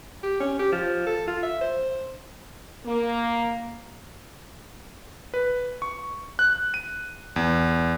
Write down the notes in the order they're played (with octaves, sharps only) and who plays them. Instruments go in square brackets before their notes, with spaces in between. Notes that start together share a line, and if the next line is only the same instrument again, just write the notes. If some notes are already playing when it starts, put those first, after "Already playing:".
[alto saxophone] G4
C#4
G4
F3
A4
F4
E5
C5
[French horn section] A#3
[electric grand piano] B4
C#6
F#6
D#7
E2